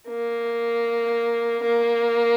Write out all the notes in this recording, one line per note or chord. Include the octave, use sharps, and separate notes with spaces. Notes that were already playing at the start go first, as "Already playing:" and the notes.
A#3
A#3